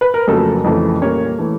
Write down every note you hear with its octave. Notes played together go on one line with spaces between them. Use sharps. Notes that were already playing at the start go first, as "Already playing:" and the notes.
B4
A#4
F2 C#3 F#3 A3 A#3 A4
F2 C#3 E3 A3
A#2 G3 A#3 C#4 C#5
E3 A3